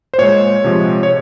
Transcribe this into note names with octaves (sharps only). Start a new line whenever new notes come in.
C5
A#2 G#3 C#5
C3 F3 G#3
C#5